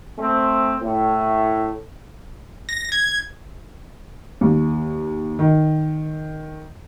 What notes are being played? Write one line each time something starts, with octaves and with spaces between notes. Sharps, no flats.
A3 C4
A2
A#6
G#6
D#2
D#3